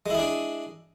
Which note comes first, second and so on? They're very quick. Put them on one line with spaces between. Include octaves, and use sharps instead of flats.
G#3 E4 G#4 D4